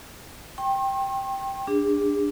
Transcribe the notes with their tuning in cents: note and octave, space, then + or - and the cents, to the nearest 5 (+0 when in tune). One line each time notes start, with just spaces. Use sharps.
G5 +0 C6 +45
D4 +0 G#4 -40